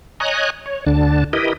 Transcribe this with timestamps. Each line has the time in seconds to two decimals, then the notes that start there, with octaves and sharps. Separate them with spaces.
0.20 C#5 D#5 G#5 A#5 F#6
0.66 C#5
0.87 D2 D3 D4 A5
1.33 E4 G4 A#4 B4 D#5